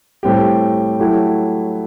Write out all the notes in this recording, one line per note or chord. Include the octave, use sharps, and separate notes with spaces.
A2 G3 C4 G4
F#3 A3 E4 G4